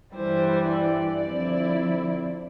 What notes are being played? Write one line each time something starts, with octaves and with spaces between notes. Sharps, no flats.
G2 E3 G3 C5
D5
D3 F3 C4 E4